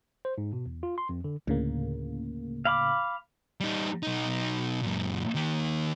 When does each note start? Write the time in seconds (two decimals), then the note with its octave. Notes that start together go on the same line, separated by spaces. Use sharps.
0.25 C5
0.38 G#2
0.53 B2
0.66 E2
0.83 F4
0.98 C6
1.09 F2
1.24 D3
1.47 D2 A2 C#3 A#3
2.65 F5 B5 D6
3.60 G3 D#4
4.03 B1 D#4
4.82 F#2 A#2
5.35 D#3 A#3